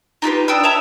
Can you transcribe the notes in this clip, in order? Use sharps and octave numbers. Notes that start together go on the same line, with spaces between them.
D#4 F4 G4 B4
D4 G5 D#6 E6
C#5 E5 A5 A#5